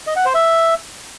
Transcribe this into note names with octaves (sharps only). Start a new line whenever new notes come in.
D#5
F#5
C5
E5